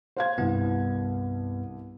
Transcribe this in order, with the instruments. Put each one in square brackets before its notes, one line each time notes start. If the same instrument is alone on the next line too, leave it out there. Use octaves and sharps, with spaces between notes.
[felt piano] C5 F5 G#6
[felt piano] C2 [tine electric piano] G2 B3